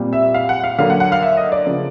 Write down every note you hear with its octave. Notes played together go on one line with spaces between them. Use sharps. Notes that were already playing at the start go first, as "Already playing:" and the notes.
Already playing: A#2 G3 C4
E5
F5
F#5
F5
D3 F#3 A#3 F5
F#5
F#5
F5
E5
D#5
D5
C#3 F3 A#3